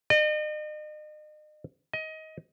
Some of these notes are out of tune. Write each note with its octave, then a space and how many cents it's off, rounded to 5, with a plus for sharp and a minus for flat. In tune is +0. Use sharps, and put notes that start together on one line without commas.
D#5 -40
D#5 +20